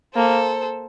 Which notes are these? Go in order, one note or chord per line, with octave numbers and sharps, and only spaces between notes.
A#3 A4 C5